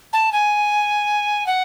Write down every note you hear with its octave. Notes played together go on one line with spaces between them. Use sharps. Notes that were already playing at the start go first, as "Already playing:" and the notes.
A5
G#5
F#5